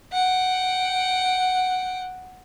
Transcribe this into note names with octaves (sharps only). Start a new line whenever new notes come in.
F#5 G5